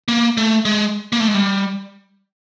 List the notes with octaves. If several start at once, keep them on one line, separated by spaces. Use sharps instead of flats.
A#3
A3
G#3
A#3
A3
G#3
G3